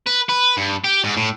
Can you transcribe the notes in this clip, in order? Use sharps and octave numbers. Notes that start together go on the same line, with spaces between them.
B4
B4
G2
G4
G#2
A2